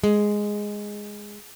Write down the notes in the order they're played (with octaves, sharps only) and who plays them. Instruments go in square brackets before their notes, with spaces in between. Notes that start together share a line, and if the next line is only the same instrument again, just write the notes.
[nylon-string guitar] G#3